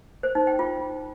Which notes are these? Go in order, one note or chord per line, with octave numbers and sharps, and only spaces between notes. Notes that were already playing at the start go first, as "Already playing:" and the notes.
C5
D#4
G5
F4